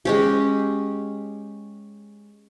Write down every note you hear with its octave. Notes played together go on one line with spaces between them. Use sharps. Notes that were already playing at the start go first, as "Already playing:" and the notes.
G#3 C#4 G4